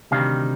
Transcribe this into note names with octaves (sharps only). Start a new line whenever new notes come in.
D2 C3 D#3 G3 F5